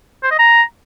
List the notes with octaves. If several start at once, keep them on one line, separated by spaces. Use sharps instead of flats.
C5
D#5
A#5